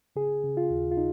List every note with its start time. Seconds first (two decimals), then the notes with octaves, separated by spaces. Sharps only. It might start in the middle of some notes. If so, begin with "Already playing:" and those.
0.16 C#3 G#4
0.44 C#3
0.57 F4
0.70 D#2
0.91 F4
0.97 D#4